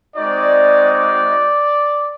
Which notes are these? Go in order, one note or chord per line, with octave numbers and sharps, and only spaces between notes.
G#3 C4 D#4 F#4 D5
D5